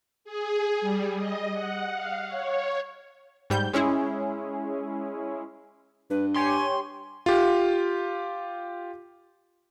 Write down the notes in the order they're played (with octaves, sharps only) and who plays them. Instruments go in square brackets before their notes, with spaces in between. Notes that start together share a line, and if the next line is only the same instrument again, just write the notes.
[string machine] G#4
G3
D#5
F#5
F5
C#5
[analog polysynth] G#2 G3 G6
G#3 C#4 E4 G#4
[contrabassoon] G2 [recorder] B4
[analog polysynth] G4 C#5 [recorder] G#5 [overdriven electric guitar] C6
[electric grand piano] F4 G4